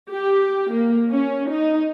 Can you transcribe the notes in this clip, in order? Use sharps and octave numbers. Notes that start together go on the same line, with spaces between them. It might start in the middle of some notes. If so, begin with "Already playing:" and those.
G4
A#3
C#4
D#4